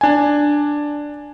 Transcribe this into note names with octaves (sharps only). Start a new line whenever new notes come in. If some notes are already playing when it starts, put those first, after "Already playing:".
D4 G#5